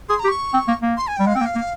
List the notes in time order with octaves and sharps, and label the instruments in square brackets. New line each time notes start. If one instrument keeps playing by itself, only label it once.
[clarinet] G#4 [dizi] C6
[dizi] A#5
[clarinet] G4
[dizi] C#6
[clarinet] C4
A#3
A#3
[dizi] C6
G#5
G5
[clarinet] G3
[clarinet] G#3 [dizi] F5
[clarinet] C4 [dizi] G5
[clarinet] A#3
[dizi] F5
[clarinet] A#3